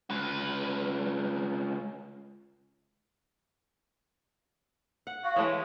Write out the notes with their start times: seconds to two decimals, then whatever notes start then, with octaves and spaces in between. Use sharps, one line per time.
0.10 C#2 B4
5.07 F#5
5.24 F#4 F5
5.36 E3 G#3 A3 G4 C#5